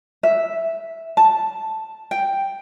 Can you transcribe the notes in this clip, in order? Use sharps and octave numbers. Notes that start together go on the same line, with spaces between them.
E5
A5
G5